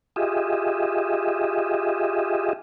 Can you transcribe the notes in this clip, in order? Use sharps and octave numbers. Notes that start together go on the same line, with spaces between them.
F4 G4 G#4 D#5 E5